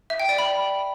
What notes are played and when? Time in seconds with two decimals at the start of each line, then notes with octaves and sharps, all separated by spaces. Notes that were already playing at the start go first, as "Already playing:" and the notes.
0.10 E5
0.20 G5
0.29 D5
0.38 B5